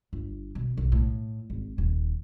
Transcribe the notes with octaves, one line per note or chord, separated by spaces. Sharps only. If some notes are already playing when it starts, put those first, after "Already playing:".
G1
B2
B1
A2
G#1
D#1